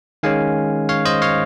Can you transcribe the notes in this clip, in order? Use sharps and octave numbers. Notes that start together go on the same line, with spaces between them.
D#3 G#3 C#4 F5 G#5
C#5 F5
C5 D#5
C#5 F5